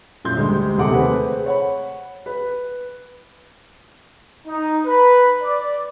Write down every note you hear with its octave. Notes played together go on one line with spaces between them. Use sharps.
F#2 A#2 C6 G6
D2 G3 G#3
D#2 C3 G#4 A4 F#5 D6
A3 C4 G#4 B4
C#5 F#5 B5
B4
D#4
B4
D5